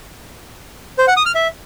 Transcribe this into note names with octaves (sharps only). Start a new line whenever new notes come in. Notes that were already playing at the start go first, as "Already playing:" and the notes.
C5
F#5
D#6
F6
E5